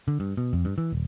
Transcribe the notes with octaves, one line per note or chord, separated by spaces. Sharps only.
D3
G2
B2
F2
G2
E3
D#1